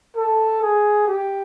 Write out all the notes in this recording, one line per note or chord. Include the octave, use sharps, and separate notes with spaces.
A4
G#4
G4